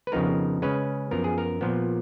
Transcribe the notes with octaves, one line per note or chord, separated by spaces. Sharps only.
B4
F2 C#3 F3 B3 D#4 A#4
C#3 G#3 C#4 B4
F#2 F3 B3 A#4
G#4
A#4
A#2 F3 B3